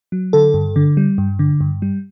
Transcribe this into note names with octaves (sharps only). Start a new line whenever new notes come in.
F#3
D3 A4
G2
D3
G3
G2
D3
G2
G3